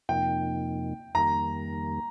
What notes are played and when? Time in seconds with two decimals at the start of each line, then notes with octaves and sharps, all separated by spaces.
0.09 F2 C3 F3 A#3 D#4 G5
1.14 F2 D#3 G3 A#3 A#5